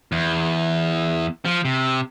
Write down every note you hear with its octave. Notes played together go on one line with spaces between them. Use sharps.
E2
F3
C3